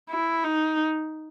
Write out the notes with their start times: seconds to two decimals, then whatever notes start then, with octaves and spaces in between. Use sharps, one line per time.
0.10 E4
0.44 D#4